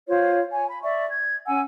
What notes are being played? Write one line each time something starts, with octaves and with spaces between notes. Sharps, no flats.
F4 C5 C#5
C#5 G#5
B5
D5 E5 C#6
G#6
C#4 F#5 G#5 E6